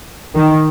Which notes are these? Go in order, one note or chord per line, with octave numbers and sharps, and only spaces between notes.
D#3